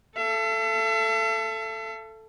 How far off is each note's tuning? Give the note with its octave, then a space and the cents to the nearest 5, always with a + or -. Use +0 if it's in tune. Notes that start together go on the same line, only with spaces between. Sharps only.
A4 +0 E5 +45